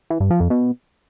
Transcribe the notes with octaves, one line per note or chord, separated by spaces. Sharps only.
E3
G2
F3
F2
B2